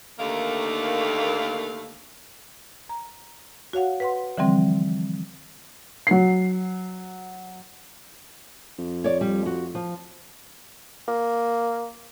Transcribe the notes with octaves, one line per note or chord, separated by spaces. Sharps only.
D#2 D3 D#3 A3 A#3 F5
A#5
F#4 C#5 F5 F#5
B4 F#5 C6
D3 E3 F3 G3 C4
F#3 C7
F2
C#5 D5
G3
F#4
F3
A#3